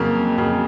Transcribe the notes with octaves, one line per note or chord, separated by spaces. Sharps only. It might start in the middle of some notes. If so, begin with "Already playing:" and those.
Already playing: F2 C#3 F#3 A#3
F2 C#3 F#3 A#3